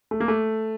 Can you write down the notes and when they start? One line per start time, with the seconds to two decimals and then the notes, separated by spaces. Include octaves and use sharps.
0.11 A3
0.20 A#3
0.28 A3